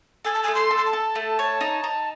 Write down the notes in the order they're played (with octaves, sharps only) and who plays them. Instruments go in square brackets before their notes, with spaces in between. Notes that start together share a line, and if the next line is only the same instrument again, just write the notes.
[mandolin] A4 [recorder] G#5
[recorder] A5
[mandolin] A3 [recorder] G#5
[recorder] C6
[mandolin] A4
[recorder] C6
A5
[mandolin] A4
A3
C#5
D#4
D#4